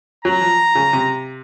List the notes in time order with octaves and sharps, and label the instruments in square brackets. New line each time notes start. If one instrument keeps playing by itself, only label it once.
[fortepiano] F#3 [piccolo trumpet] A#5
[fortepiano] F3
C#3
C3